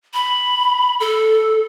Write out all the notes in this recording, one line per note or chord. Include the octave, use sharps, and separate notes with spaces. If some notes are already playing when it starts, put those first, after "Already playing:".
B5
A4